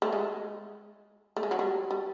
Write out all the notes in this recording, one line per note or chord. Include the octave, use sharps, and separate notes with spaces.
A3
G#3
A3
G#3
F#3
G3
G3